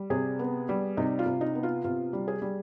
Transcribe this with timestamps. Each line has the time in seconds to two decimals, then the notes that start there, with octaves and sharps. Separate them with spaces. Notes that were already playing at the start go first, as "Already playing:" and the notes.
Already playing: G3
0.10 C3 G#4
0.39 B3
0.69 G3
0.97 C3 D#4
1.19 F4
1.26 C3
1.41 D#4
1.55 B3
1.63 F4
1.84 C3 F4
2.13 G3
2.28 G#4
2.42 G3